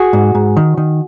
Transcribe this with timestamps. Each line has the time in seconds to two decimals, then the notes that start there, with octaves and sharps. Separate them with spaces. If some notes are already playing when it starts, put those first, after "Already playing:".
Already playing: F#4 G#4
0.13 G#2
0.35 G#2
0.57 D#3
0.77 D#3